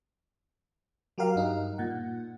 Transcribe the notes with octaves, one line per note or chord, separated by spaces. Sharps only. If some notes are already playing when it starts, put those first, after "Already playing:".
F#3 F#4 G4 A#4 F5
G2 D#4
A#2 F#5